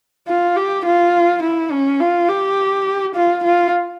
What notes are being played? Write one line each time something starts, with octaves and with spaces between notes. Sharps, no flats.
F4
G4
F4
E4
C#4
F4
G4
F4
F4